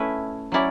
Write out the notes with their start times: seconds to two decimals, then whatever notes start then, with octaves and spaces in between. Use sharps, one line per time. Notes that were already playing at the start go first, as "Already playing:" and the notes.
Already playing: A3 C#4 E4 B4 E5
0.52 F#3 C#4 E4 D5